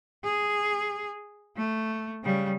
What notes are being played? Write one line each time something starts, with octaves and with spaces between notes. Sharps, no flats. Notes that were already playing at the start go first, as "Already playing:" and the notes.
G#4
A3
C#3 G3